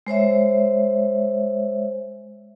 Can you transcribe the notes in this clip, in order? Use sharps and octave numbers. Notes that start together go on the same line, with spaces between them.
G#3 C5 C#5 E5